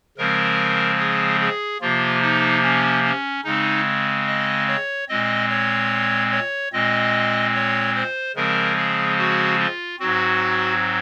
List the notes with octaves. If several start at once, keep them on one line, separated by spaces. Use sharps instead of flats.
C#3 F3 G#3 C4 A#4
G#4
G#4
C3 F3 A#3 F4
D#4
C#4
C#4
C#3 G#3 C4 D#4
D#5
C#5
A#2 G#3 C4 D#5
C#5
C#5
A#2 G#3 C4 D#5
C#5
C5
C#3 F3 G#3 C4 A#4
G#4
F#4
F4
G#2 F#3 C4 F#4